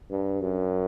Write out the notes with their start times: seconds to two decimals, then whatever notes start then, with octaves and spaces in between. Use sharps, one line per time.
0.10 G2
0.41 F#2